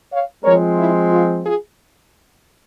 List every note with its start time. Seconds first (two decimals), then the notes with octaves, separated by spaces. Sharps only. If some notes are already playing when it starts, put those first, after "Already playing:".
0.11 C#5 F5
0.44 F3 G#3 C4 A#4 C#5
0.77 E4
1.10 F4
1.44 F4 G#4